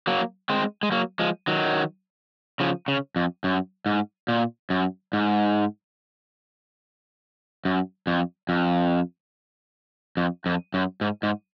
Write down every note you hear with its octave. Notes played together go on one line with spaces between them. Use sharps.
F#3 A#3
G#3 C4
G#3
F#3 A#3
F3 G#3
D#3 F#3
C#3 F3
C#3
F2
F#2
G#2
A#2
F#2
G#2
F#2
F2
F2
F2
F2
F#2
G#2
G#2